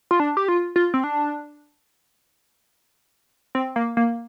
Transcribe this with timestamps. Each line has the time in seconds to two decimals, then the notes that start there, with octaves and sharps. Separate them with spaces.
0.11 F4
0.20 D4
0.37 G4
0.48 F4
0.76 F4
0.94 C4
1.04 D4
3.55 C4
3.76 A#3
3.97 A#3